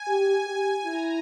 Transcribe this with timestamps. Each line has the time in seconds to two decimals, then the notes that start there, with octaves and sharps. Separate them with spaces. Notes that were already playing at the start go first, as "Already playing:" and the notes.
Already playing: G#5
0.08 G4
0.47 G4
0.85 E4 A#5